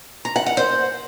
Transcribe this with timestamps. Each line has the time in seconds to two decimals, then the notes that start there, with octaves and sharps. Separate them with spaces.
0.25 A#5
0.36 F#5
0.46 F#5
0.57 C5